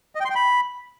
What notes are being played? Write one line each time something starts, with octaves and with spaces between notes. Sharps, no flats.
D#5
G5
C6
G5
B5